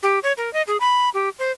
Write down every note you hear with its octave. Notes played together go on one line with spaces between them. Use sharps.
G4
C#5
A#4
D#5
G#4
B5
G4
C5